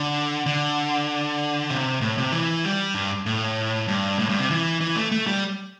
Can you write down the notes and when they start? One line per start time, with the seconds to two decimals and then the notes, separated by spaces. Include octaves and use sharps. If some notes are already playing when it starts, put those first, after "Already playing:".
Already playing: D3
0.46 D3
1.70 C3
2.01 A2
2.18 C3
2.32 E3
2.64 G3
2.95 G2
3.26 A2
3.88 G2
4.19 A2
4.29 G2
4.39 C3
4.50 E3
4.81 E3
4.96 A3
5.12 A3
5.27 G3